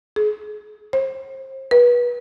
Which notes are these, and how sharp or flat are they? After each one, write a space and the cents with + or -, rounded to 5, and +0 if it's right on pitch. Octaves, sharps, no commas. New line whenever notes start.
G#4 +35
C5 +35
B4 -25